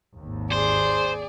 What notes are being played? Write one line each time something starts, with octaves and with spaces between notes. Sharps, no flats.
G#1 D#2
G#4 C5 D5